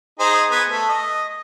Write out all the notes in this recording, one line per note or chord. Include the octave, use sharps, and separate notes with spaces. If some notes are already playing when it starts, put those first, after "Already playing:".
D#4 G#4 C5
B3 B4 G#5
A3
D#5